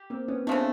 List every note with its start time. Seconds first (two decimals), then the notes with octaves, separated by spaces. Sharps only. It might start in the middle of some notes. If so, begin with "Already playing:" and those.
Already playing: G4
0.10 A#3 C4
0.28 B3 C#4
0.47 C#3 F3 A3 C4 D4